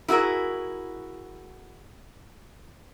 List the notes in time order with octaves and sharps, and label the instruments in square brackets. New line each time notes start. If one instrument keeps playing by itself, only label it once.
[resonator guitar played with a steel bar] E4 F#4 G#4 A#4